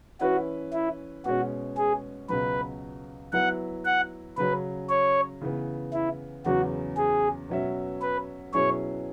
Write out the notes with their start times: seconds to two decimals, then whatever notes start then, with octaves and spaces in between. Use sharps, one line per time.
0.21 E3 C#4 E4 F#4 B4
0.73 E4
1.25 B2 G#3 C#4 F#4
1.77 G#4
2.29 C#2 B2 F#3 B4
3.33 F#3 B3 E4 B4 F#5
3.85 F#5
4.37 C#3 F#3 C#4 B4
4.89 C#5
5.41 C#3 E3 B3
5.93 E4
6.46 E2 C#3 F#3 C#4 F#4
6.97 G#4
7.49 B2 F#3 C#4 F#4 E5
8.01 B4
8.53 B2 F#3 C#4 E4 G#4 C#5